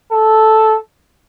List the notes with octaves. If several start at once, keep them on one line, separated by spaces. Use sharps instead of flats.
A4